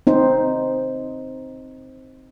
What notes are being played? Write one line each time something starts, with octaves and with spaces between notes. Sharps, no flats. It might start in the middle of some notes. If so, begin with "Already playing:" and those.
C4 D#4 C5